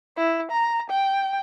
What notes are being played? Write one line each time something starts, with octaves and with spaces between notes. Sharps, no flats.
E4
A#5
G5